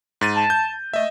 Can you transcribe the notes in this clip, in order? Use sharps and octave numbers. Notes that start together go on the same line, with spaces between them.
G#2 A6 D#7
A5
G6
A3 D#5 E5